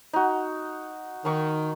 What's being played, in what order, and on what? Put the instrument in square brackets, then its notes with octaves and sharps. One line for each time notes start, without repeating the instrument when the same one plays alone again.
[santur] D#4 F#4
[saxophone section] D#3 [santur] A#5 C#6